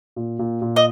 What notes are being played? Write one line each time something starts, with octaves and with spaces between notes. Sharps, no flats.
A#2
A#2
A#2
D#5